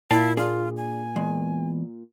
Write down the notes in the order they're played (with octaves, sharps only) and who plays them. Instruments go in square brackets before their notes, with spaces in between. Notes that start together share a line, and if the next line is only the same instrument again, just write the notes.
[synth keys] A#2 [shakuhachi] E4 [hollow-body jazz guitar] F5 G5 A5
[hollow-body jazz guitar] D4 G#4 [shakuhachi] F4
[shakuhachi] G#5
[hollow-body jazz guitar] E2 G#3